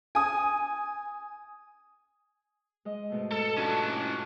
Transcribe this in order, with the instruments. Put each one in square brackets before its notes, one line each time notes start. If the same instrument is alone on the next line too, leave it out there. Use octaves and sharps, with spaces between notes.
[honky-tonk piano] G#5 D#6
[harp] G#3 D#5
G#2 B2 A3
[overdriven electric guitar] A4
[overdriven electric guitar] C#4 A5 [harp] D4 F4 F#4